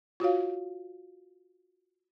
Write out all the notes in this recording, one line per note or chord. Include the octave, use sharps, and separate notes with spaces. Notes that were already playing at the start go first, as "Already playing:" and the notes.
F4 F#4 C#5 F5